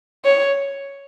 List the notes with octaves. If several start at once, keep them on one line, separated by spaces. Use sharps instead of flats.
C#5